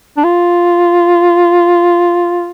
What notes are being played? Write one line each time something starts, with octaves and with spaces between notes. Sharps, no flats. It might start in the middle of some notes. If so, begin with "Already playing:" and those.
D4
F4